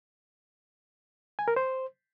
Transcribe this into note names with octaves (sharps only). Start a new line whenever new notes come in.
G#5
A#4
C5